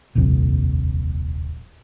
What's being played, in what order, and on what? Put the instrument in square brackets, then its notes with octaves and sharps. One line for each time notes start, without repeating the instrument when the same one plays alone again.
[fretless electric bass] D#1 A#1 F2 C3